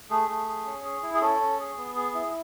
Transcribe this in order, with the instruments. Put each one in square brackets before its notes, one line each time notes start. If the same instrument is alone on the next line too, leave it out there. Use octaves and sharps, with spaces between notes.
[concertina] A3 G#4
A3
G#4
C#4
G#4
E4
G#4
C#4 A4
C#4
G#4
B3
G#4
E4